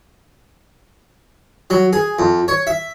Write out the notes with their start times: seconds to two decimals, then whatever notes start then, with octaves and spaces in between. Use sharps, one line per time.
1.70 F#3
1.93 G#4
2.19 F2
2.48 C#5
2.67 E5